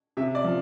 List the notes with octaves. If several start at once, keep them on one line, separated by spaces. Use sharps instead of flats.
C3 E5
D5
F3